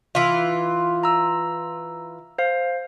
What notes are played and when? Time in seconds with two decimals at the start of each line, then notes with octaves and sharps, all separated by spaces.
0.15 E3 F4
1.03 A#5 E6
2.38 C5 F5